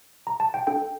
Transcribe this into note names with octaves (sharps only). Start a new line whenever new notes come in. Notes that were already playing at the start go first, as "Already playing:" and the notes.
A#5
A5
G5
D4 A4 G5